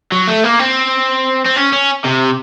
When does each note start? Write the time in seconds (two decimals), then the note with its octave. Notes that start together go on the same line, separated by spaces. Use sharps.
0.12 F#3
0.28 A3
0.44 A#3
0.59 C4
1.45 C4
1.56 C#4
1.72 C#4
2.04 C3